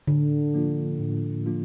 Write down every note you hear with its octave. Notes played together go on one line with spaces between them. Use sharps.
A2 D3
F3 A#3 D4 F4
A2
F3 A#3 D4 F4